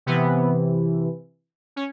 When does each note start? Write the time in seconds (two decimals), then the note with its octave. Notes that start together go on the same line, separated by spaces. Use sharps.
0.06 C3 E3 B3
1.76 C#4